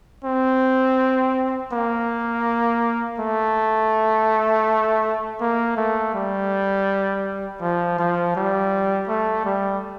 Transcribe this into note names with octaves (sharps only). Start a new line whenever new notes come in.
C4
A#3
A3
A#3
A3
G3
F3
F3
G3
A3
G3